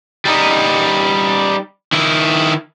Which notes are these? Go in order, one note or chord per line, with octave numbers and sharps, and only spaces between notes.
G3 D#4
D#3 E4